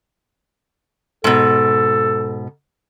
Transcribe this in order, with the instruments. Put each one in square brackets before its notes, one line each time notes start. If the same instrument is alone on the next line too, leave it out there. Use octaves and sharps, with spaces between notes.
[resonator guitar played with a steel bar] G#2 B2 [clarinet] A4